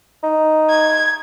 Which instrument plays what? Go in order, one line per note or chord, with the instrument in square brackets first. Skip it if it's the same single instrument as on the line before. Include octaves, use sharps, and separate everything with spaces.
[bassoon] D#4
[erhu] G#6